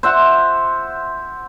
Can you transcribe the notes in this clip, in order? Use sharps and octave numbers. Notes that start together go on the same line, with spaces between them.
C5 E5 F#5